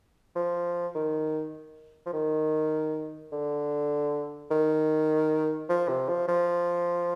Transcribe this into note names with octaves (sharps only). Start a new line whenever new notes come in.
F3
D#3
F3
D#3
D3
D#3
F3
C3
F3
F3